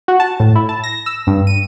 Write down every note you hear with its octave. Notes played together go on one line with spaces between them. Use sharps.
F#4
A5
A2
E4
A5
A#6
E6
G2
D#7